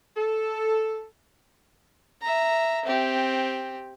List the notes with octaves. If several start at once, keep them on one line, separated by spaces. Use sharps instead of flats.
A4
E5 A#5
C4 G4